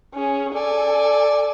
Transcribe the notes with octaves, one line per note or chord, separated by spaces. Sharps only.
C#4 G#4
A4 D5 G#5